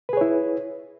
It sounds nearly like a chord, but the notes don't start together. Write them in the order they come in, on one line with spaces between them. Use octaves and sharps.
B4 G#4 C#5 E4